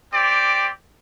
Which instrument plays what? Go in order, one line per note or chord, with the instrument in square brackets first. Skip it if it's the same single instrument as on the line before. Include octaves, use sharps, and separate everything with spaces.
[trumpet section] C4 G4 D5